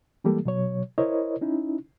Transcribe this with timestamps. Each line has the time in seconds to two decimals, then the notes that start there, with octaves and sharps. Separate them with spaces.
0.24 E3 G3 G#3 A#3 G4 A4
0.45 B2 F#3 C#5
0.98 E4 A#4 C5 C#5 D#5
1.41 C#4 D#4 E4